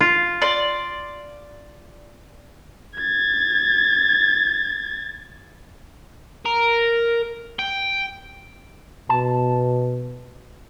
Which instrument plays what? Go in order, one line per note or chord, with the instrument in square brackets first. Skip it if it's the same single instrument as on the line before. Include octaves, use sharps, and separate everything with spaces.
[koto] F4
[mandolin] D5 C6
[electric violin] G#6 A6
[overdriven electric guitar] A#4
G5
[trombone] B2 [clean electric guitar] A5